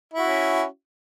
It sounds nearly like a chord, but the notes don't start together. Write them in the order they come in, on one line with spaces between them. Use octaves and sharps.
E4 F#4 C#4